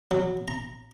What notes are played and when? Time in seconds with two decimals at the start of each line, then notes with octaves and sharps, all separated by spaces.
0.11 F#3
0.48 A#5